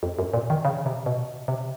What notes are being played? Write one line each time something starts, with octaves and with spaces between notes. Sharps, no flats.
F2
F#2
A#2
D#3
C#3
C3
B2
C3